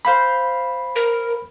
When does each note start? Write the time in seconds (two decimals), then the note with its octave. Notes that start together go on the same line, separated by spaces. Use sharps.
0.05 C5 F5 B5 C6
0.96 A#4